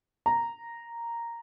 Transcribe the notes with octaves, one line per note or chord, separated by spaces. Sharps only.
A#5